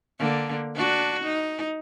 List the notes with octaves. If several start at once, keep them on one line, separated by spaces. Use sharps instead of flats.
D3 A#3
D4 F#4
D#4